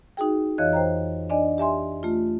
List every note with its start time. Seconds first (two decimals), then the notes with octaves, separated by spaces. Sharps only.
0.17 D#4 F#4 G#4 G5
0.58 F2 E3 C#5 D#5 F5 F#6
0.73 C5 G5 A#5
1.30 D4 D5 D#5 G#5
1.58 G4 E5 G#5 C6
2.03 A3 F4